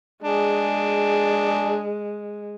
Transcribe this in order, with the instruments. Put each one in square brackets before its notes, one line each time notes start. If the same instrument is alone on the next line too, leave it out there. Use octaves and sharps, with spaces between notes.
[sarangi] G#3 [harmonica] D4 G#4